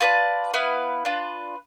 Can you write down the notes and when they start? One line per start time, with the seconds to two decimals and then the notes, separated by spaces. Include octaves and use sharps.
0.01 F4 B4 D5 A5
0.54 B3 E4 B4 F5
1.05 D4 F4 B4